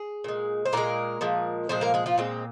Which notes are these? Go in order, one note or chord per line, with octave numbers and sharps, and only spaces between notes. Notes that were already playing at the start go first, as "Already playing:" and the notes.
Already playing: G#4
A#2 G#3
C5
A#2 G#3 A#3 A#4
A#2 F3 G#3
A#2 F3 G#3 C5
A#3 A#4
G#3 G#4
F3 F4
A#2 G#3 C4